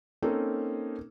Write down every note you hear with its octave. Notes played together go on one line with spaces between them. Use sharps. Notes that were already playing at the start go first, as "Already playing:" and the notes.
A#3 C4 C#4 D#4 A4